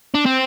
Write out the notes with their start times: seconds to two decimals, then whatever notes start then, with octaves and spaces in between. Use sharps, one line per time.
0.15 D4
0.26 C4